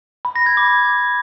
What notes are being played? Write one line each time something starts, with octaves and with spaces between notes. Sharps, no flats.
B5
A#6
G#6
D6